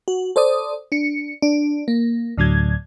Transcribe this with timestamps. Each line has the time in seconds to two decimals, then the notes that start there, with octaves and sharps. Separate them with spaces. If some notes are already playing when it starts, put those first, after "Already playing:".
0.08 F#4
0.36 A4 C5 D5 D#6
0.92 D4 C#7
1.42 D4
1.88 A#3
2.38 D2 A2 D3 F#3 G#6